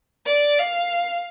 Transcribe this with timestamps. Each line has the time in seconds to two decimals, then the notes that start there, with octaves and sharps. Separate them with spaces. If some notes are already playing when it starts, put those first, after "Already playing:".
0.26 D5
0.58 F5